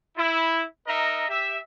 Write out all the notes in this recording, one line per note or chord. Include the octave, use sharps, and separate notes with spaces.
E4
D#4 A#4 D#5 E5 A#5
G4 E5